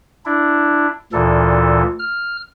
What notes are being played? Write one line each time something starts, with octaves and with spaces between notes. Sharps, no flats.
D4 E4
D2 A#2 E3 A4
F6